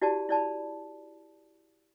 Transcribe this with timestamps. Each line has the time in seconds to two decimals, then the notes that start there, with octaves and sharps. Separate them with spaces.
0.02 E4 F#4 G4 D5 A5
0.29 E4 D5 A5 B5